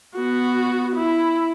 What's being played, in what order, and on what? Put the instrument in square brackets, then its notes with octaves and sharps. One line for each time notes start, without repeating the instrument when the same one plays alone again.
[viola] B3 F#4
E4